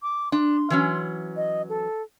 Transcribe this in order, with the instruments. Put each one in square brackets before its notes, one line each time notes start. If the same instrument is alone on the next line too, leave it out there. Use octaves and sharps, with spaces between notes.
[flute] D6
[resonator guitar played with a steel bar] D4 [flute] C6
[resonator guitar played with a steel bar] E3 F#3 C#4
[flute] D#5
A4